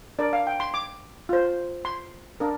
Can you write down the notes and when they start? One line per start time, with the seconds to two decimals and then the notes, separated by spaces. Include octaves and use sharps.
0.19 D4 A#4 D5
0.33 F5
0.47 G5
0.60 C6
0.74 D6
1.29 F4 C5
1.85 C6
2.40 D4 A#4